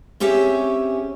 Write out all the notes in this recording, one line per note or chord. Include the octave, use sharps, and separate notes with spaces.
C4 C#4 G4 G#4 C#5 E5